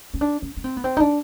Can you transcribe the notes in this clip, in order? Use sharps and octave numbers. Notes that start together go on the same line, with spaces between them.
C#4
D4
C#4
C#4
C4
B3
C4
D#4
D4